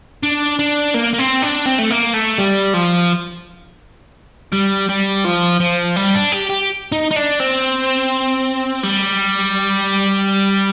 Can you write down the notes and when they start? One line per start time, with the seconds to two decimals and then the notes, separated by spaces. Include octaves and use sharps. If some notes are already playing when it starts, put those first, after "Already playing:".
0.23 D4
0.59 D4
0.94 A#3
1.14 A#3
1.19 C4
1.43 D4
1.66 C4
1.79 A3
1.91 A#3
2.14 A3
2.38 G3
2.74 F3
4.53 G3
4.89 G3
5.25 F3
5.60 F3
5.96 G3
6.15 D4
6.32 G4
6.50 G4
6.92 D#4
7.11 D#4
7.16 D4
7.40 C4
8.83 G3